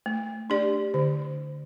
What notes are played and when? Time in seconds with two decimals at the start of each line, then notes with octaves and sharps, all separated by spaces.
0.06 A3
0.50 D4 G4 D5
0.94 D3